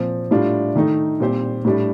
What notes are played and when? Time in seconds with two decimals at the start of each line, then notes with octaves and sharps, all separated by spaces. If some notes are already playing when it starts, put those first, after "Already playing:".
Already playing: A#2 F3 C4
0.31 A2 G3 D4 F4
0.75 D#3 A3 D#4
1.20 A#2 G3 C4 G4 C5
1.65 A2 G3 D4